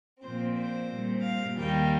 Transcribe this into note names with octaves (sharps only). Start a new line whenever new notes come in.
A#2 F3 C4 C5
C5
A#2 G3 C4
F5
D#2 D#3 G3 A#3 G5